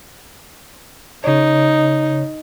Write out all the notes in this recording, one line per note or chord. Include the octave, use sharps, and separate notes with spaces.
C#3 D#4 C#5